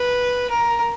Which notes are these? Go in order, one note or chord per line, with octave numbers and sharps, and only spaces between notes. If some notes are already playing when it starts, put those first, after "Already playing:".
Already playing: B4
A#4